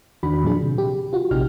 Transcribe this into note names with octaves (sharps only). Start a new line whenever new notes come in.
E2 D#3 D4 F#4 B5
A#2 F3 F#3 D4 G#4
C3
G4
F4 F#4
A#1 C3 D#4 G4 F6